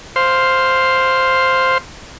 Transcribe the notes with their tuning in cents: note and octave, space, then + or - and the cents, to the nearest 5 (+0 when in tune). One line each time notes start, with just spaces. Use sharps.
C5 +0 F5 +0